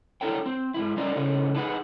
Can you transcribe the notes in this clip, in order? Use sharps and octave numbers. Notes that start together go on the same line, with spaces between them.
D4 E4 A4 A#4 C#5 G5
C4
G#2 B2 E4
G3 C#4 D#4 F4 A#4 D5
A2 C#3 C#4 D#4
D4 D#4 G#4 B4 F#5